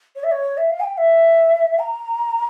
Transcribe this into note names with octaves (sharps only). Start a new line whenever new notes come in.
C#5
E5
C#5
E5
F5
G#5
G5
E5
A#5